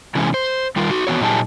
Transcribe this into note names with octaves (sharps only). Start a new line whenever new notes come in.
C3 E3 G#3 C#4
C5
D#3 G3 F4 A#4
D#4 F#4
E3 B3 F#4 C#5
A#2 F#3 G3 D#4 G#4 A5